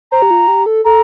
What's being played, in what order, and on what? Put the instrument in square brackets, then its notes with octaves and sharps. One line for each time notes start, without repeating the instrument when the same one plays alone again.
[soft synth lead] C5 [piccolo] A#5
[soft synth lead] G4
F4
G4
A4
[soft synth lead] A4 [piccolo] A#5